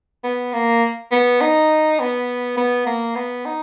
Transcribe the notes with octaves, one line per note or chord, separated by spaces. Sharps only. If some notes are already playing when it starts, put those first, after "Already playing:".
B3
A#3
B3
D#4
B3
B3
A#3
B3
D#4